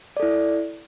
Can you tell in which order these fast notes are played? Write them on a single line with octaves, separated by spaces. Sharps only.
D5 A4 E4